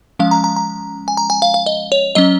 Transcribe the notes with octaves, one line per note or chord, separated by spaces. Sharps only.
F3 G#3 C#4 F5
A#5
A#5
A#5
G#5
A#5
G#5
F5
F5
D#5
C#5
F#3 C#4 D#5